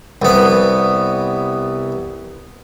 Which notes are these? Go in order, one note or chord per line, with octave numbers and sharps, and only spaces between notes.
C2 B3